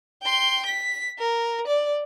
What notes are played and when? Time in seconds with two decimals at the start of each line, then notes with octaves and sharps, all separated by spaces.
0.22 G5 C6
0.66 B6
1.18 A#4
1.67 D5